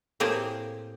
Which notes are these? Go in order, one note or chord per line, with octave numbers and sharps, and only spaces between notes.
A2 A#3 C4 G4 G#4